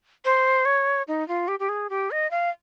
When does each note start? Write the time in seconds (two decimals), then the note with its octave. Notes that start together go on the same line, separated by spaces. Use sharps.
0.25 C5
0.65 C#5
1.08 D#4
1.28 F4
1.48 G4
1.59 G4
1.69 G#4
1.90 G4
2.11 D#5
2.31 F5